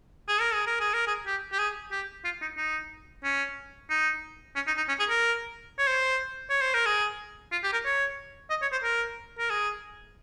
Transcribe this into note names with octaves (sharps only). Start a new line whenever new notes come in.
G#4
A#4
G#4
A#4
G#4
A#4
G#4
G4
G4
G#4
G4
F4
D#4
D#4
C#4
D#4
C#4
D#4
D#4
C#4
G#4
A#4
C#5
C5
C#5
C5
A#4
G#4
F4
G4
A#4
C#5
D#5
C#5
C5
A#4
A#4
G#4